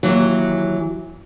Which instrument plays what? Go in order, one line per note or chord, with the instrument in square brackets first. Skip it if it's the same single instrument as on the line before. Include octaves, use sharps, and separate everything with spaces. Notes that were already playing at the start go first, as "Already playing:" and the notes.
[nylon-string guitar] D#2 G#2 E3 F#3